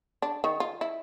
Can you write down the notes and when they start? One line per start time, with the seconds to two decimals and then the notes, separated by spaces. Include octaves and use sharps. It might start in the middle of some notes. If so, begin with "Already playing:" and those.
0.22 D4
0.44 D#3
0.60 F4
0.81 E4